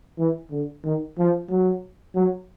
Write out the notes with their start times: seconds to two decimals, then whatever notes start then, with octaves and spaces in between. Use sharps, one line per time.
0.19 E3
0.51 D3
0.84 D#3
1.18 F3
1.50 F#3
2.15 F#3